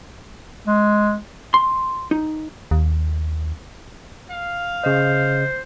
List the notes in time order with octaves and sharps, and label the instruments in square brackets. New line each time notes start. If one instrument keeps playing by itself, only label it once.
[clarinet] G#3
[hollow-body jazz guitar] C6
D#4
[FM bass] D#2
[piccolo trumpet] F5
[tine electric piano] C#3 D#5 [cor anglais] C5